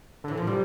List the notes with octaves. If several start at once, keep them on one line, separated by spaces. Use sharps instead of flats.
D3
A2 E3
A#2 F3
C3 G3